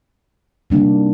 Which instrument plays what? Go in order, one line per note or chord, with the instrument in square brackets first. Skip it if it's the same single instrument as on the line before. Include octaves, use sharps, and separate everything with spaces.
[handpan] C3 D#3 G3 A#3 D4